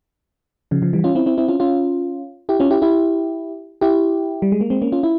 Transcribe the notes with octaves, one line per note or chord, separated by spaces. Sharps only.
C#3 F3
C#3 F3
E3 G3
C#4 F4
C4 E4
C4 E4
C4 E4
C#4 F4
C#4 F4
E4 G4
C#4 F4
E4 G4
E4 G4
E4 G4
G3
G#3
A#3
G#3 C4
A#3 C#4
C#4 F4
E4